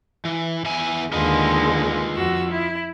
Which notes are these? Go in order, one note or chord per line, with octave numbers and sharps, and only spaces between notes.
E3
E2 E4 G#5
D#2 D3 G#3 F4 B4 D#5
F2 F#4 E6
E4